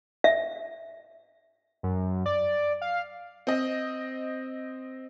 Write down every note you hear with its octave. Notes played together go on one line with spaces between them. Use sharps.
E5
F#2
D5
F5
C4 D#5